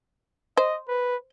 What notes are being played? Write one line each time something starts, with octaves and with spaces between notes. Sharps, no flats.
C5 D#5
B4